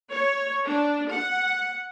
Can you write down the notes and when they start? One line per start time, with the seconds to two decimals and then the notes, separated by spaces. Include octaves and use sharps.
0.11 C#5
0.65 D4
1.11 F#5